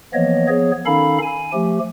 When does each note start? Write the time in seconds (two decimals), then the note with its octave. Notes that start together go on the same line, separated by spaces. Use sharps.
0.14 E3 F3 A#3 B3 C#5 D#5
0.48 F3 B3 G#4 C#5
0.86 D#3 C#4 D#4 A4 F5 B5
1.22 G#5
1.53 F3 A3 G4